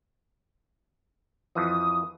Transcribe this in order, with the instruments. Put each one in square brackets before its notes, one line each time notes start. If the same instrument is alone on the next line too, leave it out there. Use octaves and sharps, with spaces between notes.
[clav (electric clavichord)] F2 E3 F3 [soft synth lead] D#6